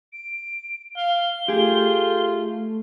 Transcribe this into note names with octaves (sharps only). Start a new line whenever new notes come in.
D7
F5 G7
A3 F4 G4 G#4